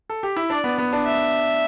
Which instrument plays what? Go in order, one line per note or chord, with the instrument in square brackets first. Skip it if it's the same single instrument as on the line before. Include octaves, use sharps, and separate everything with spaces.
[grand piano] A4
G4
E4
[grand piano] D4 [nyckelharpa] D5
[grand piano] B3
B3
D4
[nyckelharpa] E5